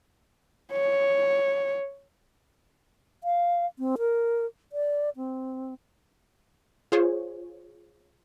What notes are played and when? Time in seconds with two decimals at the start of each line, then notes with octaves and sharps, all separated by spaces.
0.72 C#5
3.24 F5
3.79 C4
3.98 A#4
4.72 D5
5.16 C4
6.92 F4 G#4 C5 C#5